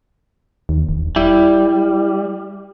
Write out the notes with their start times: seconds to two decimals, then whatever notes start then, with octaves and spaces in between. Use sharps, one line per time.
0.69 D#2
0.89 E1
1.16 G3 E4